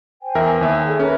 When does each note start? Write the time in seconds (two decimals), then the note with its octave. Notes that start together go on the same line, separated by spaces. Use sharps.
0.22 C5 G5 G#5
0.35 E2 A#4 E5
0.61 D#2 E5
0.85 G#4 A4 D5
1.00 C#4 A#4 B4 E5